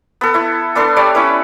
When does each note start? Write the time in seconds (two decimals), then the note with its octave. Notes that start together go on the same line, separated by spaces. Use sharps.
0.21 B3 A4
0.34 E4 C#6
0.75 B3 D4 A4 C6
0.96 G3 C#5 D5
1.15 C#4 E4 B4